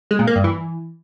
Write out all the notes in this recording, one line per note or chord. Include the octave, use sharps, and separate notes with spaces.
G#3
A#2
A#3
G2
E3